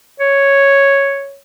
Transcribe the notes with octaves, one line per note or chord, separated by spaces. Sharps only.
C#5